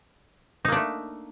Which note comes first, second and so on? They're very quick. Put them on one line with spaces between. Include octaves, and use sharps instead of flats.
D#4 A#3 D4 A3